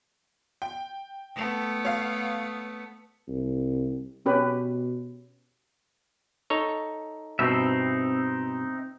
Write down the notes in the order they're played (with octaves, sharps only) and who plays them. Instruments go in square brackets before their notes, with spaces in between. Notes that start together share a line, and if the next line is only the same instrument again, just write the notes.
[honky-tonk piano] G5
[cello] A3 B3
[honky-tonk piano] C#5 F5
[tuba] C2
[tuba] B2 [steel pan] C#4 G4 B4
[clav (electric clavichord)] D#4 A4 C#5
[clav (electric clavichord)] G2 B2 [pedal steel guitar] C4 D#4 E5